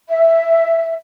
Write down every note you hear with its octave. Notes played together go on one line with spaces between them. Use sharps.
E5